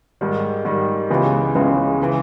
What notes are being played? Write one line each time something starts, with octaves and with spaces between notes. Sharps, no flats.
G#2 D#3 G3
G#2 D#3 G3
C#2 C#3 E3 G#3 B3
C#2 C#3 E3 G#3 B3
C#3 E3